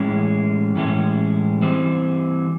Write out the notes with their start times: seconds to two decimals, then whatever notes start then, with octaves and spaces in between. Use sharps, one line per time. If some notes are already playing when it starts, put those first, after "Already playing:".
Already playing: A2 E3 G#3 C#4
0.76 A2 E3 G#3 C#4
1.62 E3 G3 C4